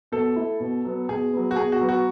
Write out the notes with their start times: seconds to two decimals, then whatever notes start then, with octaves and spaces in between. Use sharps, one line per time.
0.12 B2 A4
0.36 A3 E4
0.60 B2
0.85 F#3 B3
1.08 B2 G#4
1.33 F#3 B3
1.51 F#4
1.57 B2 G#4
1.72 F#4
1.81 F#3 B3
1.89 F#4